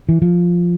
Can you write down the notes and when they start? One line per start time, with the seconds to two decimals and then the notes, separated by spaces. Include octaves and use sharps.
0.09 E3
0.22 F3